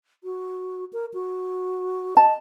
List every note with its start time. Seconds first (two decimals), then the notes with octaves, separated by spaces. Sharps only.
0.24 F#4
0.93 A#4
1.14 F#4
2.17 D#5 A5